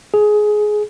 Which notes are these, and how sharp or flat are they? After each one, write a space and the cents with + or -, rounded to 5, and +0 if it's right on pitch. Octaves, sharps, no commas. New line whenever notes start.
G#4 +15